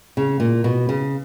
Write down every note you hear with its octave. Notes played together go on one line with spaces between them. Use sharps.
C#3
A#2
B2
C#3